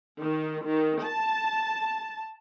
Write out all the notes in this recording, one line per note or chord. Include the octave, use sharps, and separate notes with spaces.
D#3
D#3
A5